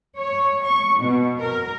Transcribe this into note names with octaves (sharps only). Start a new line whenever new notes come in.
C#5
C#6
B2
A#4